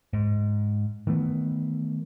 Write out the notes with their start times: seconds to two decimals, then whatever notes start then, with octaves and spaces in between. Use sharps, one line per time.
0.13 G#2
1.07 D#3 E3 A3 B3